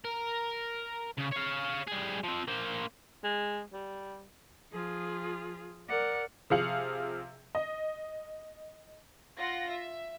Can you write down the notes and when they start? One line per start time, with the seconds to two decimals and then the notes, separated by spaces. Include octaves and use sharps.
0.05 A#4
1.18 C#3
1.31 C#5 F5
1.87 G3 G#4
2.24 F3 C4
2.48 A#3 C5
3.24 G#3
3.73 G3
4.72 F3 F4 G#4
5.89 A#4 D5 F#5
6.50 C3 F3 G#4 F5 C#7 F#7
7.55 D#5
9.38 F4 F#5 A#6
9.69 E5